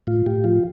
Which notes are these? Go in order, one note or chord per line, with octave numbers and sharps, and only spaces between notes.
A2 F4
A2 G4
F3 F4